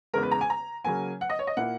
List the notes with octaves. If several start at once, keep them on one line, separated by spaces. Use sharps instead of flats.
E2 C#3 G#3 A#4
B4
A#5
G#5
A#5
C#3 F#3 A#3 G#5
F#5
D#5
C#5
D#5
A#2 A#3 E4 F#5